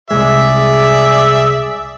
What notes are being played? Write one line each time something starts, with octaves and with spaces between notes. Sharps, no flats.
C2 F#2 G#3 G#4 D5 E5